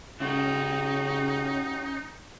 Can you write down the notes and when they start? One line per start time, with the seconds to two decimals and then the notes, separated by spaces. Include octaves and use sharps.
0.20 C#3 C#4 D#4 E4 F#4 G4